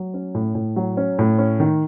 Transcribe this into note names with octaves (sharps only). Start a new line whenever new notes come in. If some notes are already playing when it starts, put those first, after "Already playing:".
Already playing: F#3
C#4
A2
A2
F#3
C#4
A2
C#4
D#3